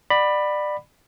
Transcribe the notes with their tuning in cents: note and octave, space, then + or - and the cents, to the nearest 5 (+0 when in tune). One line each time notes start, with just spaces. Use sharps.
D5 +25 F#5 +0 B5 +0